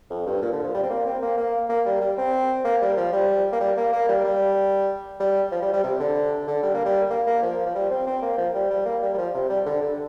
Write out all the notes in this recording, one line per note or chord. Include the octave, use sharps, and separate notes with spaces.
F2
G2
A#2
D3
F3
G3
C4
A#3
C4
A#3
A#3
A#3
G3
G3
C4
A#3
G3
F3
G3
A#3
G3
A#3
A#3
G3
G3
G3
F3
G3
G3
C3
D3
D3
G3
A#3
G3
A#3
A#3
F3
F3
G3
C4
C4
A#3
F3
G3
G3
A#3
G3
G3
F3
C3
G3
D3
D3